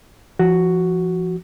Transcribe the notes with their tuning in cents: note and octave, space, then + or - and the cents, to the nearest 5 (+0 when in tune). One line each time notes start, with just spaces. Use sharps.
F3 -30 F#4 +5